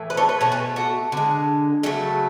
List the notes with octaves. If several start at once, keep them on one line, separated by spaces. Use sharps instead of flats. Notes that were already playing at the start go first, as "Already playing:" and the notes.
Already playing: A2 E3
B4
A4 C#5
B4
B2 A3 C#5
G#4 B4
F#4 A4
D3 G#3
C#3 F#3 A3